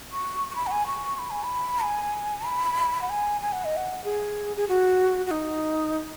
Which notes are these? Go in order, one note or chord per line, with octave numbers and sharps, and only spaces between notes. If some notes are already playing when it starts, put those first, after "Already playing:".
C#6
C#6
B5
F#5
G#5
C#6
B5
G#5
B5
G#5
B5
F#5
G#5
G#5
F#5
D#5
F#5
G#4
G#4
F#4
F#4
D#4